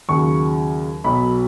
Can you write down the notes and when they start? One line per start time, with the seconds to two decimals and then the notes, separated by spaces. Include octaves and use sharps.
0.09 D#2 C#3 F#3 C#6
1.04 B1 B2 F#3 B5